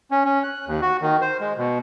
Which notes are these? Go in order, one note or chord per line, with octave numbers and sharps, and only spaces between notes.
C#4
C#4
F#6
D#2
F#4
D#3
C5
G#3
B2